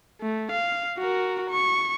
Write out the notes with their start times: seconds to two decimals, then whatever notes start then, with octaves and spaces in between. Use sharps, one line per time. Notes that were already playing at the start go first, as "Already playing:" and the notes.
0.21 A3
0.51 F5
0.99 F#4 A#4
1.50 C#6